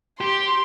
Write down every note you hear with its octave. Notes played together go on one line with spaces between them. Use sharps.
G4 C6